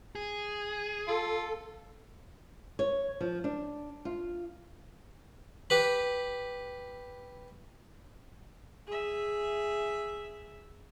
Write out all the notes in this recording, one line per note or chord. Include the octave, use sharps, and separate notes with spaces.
G#4
F4 A4
C#5
F3
D4
F4
G4 B4 B5
G#4 E5